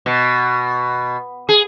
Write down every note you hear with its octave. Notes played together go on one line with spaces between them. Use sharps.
B2
G#4